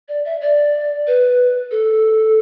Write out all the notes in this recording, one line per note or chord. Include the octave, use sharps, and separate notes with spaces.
D5
E5
D5
B4
A4